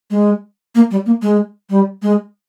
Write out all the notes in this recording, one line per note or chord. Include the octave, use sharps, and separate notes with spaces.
G#3
A#3
G3
A#3
G#3
G3
G#3